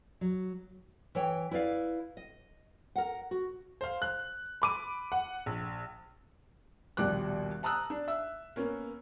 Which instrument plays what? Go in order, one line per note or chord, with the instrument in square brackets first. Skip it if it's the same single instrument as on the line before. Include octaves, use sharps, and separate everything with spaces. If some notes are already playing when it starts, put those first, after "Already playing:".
[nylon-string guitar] F#3
E3 C#5 G5
E4 B4 D5 F5
D#5
A#4 F#5
F#4
[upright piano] C5 F5
F#6
B5 D6 D#7
F#5
A#1
[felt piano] A#1 D#2 B2 G3 D6 F#6
A5 A#5 D#6 E6 F#6
D4
E5 E6
A#3 B3 C#4 A#4